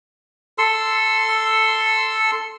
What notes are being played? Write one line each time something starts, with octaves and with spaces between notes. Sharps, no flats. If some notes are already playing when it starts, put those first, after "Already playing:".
A4 C6 E6